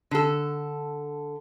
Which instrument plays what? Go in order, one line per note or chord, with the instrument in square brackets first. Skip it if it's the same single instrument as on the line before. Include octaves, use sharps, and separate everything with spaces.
[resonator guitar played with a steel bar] D3 A4